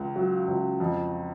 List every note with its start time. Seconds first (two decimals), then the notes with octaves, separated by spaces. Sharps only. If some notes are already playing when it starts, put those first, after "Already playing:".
Already playing: C#2 C#3
0.16 F#3
0.48 C#2
0.80 F2